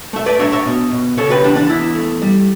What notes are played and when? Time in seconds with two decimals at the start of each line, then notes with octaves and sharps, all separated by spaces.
0.13 A3 E5
0.26 B4 D5
0.39 D4 C#5 E5
0.52 C#5 E5
0.66 B2
0.91 B2
1.17 C#3 A4 C#5
1.30 G4 B4
1.43 E3 D4
1.56 D4
1.70 E2 E4
1.95 A3
2.22 G3